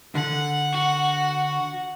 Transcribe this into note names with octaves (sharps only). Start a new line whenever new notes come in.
D3 F#5
F#4